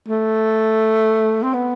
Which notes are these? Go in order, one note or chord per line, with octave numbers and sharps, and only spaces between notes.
A3
C4
B3